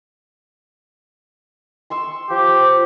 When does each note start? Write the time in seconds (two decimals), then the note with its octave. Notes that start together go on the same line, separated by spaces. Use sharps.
1.90 C6 C#6 E6
2.30 F3 G4